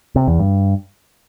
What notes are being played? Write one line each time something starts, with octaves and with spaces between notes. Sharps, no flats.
C3
E2
G2